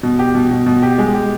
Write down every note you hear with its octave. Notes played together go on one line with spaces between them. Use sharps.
B2
G4
B2
B2
B2
G4
G#3
G4